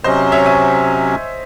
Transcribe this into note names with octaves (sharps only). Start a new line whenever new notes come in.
C3 F#3 C#4 C5 D#5
C#5 E5
E5 G#5